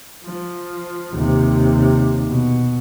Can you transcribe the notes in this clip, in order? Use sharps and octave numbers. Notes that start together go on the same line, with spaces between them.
F3
D#2 C3
B2